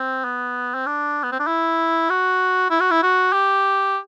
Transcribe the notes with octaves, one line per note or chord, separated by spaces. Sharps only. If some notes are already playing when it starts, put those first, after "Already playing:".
Already playing: C4
B3
C4
D4
B3
C4
D4
E4
F#4
E4
F#4
E4
F#4
G4